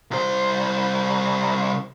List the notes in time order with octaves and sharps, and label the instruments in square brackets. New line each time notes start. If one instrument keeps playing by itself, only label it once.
[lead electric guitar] C2 C5